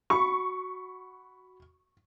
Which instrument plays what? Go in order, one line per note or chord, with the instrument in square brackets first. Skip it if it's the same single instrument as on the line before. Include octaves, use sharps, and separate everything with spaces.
[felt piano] F#4 B5 [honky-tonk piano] C#6